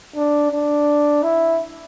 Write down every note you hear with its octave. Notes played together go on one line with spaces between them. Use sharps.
D4
D4
E4